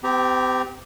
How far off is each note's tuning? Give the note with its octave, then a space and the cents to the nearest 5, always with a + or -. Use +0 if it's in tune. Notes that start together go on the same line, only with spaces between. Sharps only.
C4 -40 G4 +0 A#5 +0